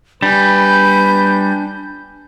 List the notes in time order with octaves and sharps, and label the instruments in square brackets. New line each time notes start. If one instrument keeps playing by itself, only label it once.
[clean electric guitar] G3 [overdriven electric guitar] D4 G#5 [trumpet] B4 [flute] G6